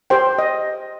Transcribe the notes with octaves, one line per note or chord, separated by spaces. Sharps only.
G4 C5 G5
D#5